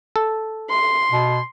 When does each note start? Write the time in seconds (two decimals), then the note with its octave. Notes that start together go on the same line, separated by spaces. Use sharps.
0.16 A4
0.70 C6
1.12 B2